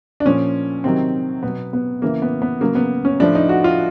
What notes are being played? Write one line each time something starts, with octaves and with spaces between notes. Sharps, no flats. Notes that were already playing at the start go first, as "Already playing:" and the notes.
D4
A#2 F3 C#4
C3 D#3 F#3 C4
B2 F#3 B3
B3
C#3 E3 A#3
B3
B3
C#3 F#3 A#3
B3
C#4
A2 F3 D4
D#4
F#4
F4